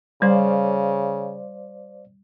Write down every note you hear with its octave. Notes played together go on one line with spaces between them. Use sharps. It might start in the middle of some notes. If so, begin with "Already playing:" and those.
C#3 G3 C5 D5 F5